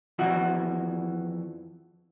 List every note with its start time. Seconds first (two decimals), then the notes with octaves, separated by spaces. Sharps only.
0.19 F2 E3 F#4